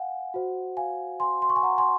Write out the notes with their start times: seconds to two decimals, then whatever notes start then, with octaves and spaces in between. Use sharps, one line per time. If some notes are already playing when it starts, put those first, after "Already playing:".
Already playing: F5 F#5 G#5
0.34 F#4 C5
0.77 F5 G#5
1.20 G#5 C6
1.42 C6
1.50 C#6
1.56 G#5 C6
1.63 F#5 A#5
1.78 G#5 C6